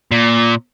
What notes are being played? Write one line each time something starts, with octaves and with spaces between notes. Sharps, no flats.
A#2